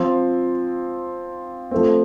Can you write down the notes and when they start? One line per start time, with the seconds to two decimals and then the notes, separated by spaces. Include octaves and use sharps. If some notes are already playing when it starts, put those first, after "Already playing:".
Already playing: F3 C4 F4
1.71 F3 A3 C4